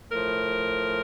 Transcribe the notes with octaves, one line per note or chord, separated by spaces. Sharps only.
A2 F3 A#4